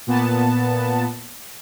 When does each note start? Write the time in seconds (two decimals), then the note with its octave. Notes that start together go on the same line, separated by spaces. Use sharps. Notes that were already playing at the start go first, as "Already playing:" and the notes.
0.07 A#2 B3 A5